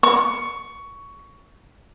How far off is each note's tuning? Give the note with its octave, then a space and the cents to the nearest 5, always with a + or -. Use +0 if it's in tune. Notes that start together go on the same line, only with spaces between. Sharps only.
C#6 +15